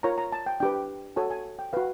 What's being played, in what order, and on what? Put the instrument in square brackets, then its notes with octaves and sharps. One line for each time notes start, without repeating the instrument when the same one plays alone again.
[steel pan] F4 A#4 C#5 A#5
A#5
A5
G5
D4 G4 B4 G5
F#4 A4 C#5 G#5
G#5
G5
F#4 B4 F5